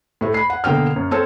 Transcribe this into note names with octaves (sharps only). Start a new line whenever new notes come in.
A2 A3
B5 C7
F#5
B2 D3 A#3 G5 F6
F#2
C4 A4 C#5